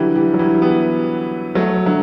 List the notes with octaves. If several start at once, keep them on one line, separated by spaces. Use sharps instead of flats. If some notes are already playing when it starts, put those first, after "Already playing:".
Already playing: D3 E3 F#3 G3
E3 G3
F#3
E3 G3
G3 B3
F#3 A3
D3 F#3